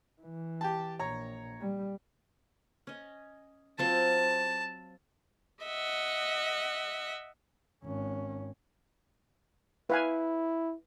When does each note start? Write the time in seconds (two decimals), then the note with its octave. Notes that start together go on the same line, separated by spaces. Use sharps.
0.22 E3
0.61 G4 G5 A5
0.99 A#1 C#5 A#5
1.61 G3
2.87 C#4 D#5
3.79 F#3 C4 F4 A5
5.64 D#5 E5 F#5
7.84 G#1 C#4
9.90 E4 B4 F5 G#5